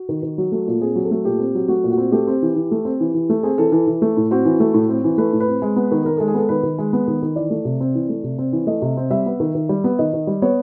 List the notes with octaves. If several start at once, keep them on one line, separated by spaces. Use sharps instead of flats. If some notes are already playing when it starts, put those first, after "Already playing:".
Already playing: F#4
D#3
D#3
F#3
A3
A#2
C4 G#4
F#3
A4
A3
A#2 G4
C4
F#3
A3 F#4
A#2
F#4
C4
A3 G4
C4
E3
E3
A3
C4
E3
E3
A3
C4 G#4
E3 A4
E3 A4
E3
A3
A2
C4 F#4
E3
A3
A2
C4
E3
A3 B4
A2
B4
C4
G#3
B3
D#3
D#3 A#4
G#3 A4
G#4
B3 A4
D#3 B4
D#3
G#3
B3
D#3
D#3
E3 D5
A3
C3
C4
E3
A3
C3
C4
E3
A3 D#5
C3
C4
G3 E5
B3
D#3
D#3
G3
B3
D#3 D#5
D#3
G3
B3 C#5